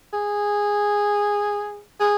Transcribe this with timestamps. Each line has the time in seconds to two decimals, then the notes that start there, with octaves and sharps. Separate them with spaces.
0.13 G#4
2.00 G#4